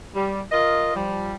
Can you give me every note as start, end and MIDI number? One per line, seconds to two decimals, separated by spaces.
0.15 0.40 55
0.52 0.95 65
0.52 0.95 70
0.52 0.95 75
0.95 1.34 53
0.95 1.34 55